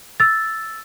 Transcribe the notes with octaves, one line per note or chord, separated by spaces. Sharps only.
E6 A6